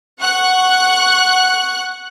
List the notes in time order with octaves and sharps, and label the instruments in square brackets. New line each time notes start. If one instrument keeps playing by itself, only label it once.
[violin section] F#5 C#6 F#6